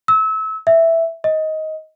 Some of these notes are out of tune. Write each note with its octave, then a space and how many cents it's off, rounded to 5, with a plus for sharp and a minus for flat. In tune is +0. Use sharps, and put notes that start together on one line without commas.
E6 -30
E5 +0
D#5 +15